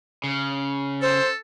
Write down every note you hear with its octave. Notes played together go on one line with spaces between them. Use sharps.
C#3
A4 C5